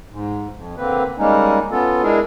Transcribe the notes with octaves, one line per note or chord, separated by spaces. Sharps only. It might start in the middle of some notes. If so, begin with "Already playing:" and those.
G#2
F2
D3 A#3 C4 B4
G3 G#3 A#3 C#4 D#4
B3 C#4 F4 A4
G#3 D4 E4 G#4 A#4